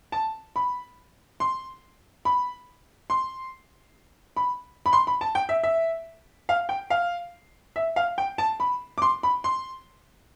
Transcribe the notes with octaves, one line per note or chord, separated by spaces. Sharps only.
A5
B5
C6
B5
C6
B5
B5
C6
B5
A5
G5
E5
E5
F5
G5
F5
E5
F5
G5
A5
B5
D6
C6
B5
C6